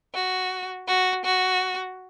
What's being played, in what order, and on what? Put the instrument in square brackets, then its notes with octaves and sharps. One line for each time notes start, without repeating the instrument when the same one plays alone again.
[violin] F#4
F#4
F#4